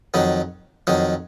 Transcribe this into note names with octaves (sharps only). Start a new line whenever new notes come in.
F2 D#3 F#3
F2 D#3 F#3